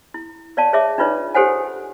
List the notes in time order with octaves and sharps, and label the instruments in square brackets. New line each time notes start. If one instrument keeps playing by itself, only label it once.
[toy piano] E4
C#5 D5 F5 A5
G#4 C#5 E5 D6
D4 D#4 F4 B4 C#5 D5
G4 A4 C5 C#5 F#5 G#5